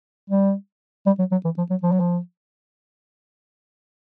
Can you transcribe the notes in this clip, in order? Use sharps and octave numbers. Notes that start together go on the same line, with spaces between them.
G3
G3
F#3
F#3
E3
F3
F#3
F3
F#3
F3